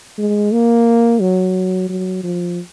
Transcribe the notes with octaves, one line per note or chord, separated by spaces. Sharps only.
G#3
A#3
F#3
F#3
F3